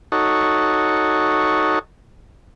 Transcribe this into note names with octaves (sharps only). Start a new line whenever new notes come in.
D#4 F#4 A4 C#5